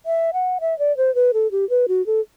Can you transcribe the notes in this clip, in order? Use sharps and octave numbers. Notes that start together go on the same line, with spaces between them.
E5
F#5
E5
D5
C5
B4
A4
G4
B4
F#4
A4